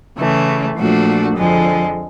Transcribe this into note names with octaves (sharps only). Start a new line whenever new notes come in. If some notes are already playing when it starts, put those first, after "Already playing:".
C#3 E3 A3
A#2 F3 A3 D4 F#4
F2 D3 F3 G#3